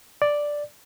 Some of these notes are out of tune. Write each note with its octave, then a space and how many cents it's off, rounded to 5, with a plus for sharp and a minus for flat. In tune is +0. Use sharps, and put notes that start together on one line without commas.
D5 +0